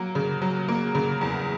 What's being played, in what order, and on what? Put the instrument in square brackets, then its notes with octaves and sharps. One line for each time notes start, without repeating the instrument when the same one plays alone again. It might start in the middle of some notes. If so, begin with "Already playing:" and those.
Already playing: [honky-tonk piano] F#3 A#3
C#3
F#3
A#3
C#3
E2